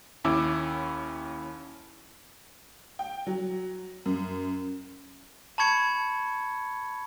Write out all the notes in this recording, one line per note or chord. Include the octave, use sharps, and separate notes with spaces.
D#2 C#4 E4 D6 E6
G5
F#3
F#2
A5 B5 C#6 G#6 C#7